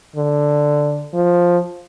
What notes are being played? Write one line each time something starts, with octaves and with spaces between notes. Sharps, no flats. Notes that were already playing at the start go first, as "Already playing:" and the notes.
D3
F3